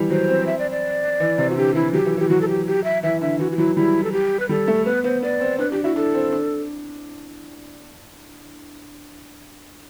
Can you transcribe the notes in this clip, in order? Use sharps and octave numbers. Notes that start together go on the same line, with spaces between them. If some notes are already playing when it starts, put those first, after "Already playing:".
Already playing: E3 G3
F#3 C5
C4
E5
D5
D5
E3
C3
F#4
D3 G4
E3 E4
F#3 G4
E3
E3 G4
F#3 F#4
A4
G4
G4
E5
E3 E5
D3 E5
E3 F#4
F#4
F#3 E4
G3 E4
A4
G4
B4
G3 A4
A3
B3 B4
B3 C5
B3 D5
C4
D4 B4
D4 G4
E4 F#4
D4 A4
C4
D4